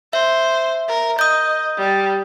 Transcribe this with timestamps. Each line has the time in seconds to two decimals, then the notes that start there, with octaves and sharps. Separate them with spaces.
0.13 C5 E5
0.88 A#4
1.19 D#5 D#6 G6
1.78 G3